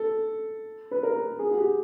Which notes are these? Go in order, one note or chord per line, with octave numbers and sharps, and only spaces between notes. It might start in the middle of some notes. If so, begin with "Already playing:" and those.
Already playing: A4
B4
A#4
G#4
F#4
G4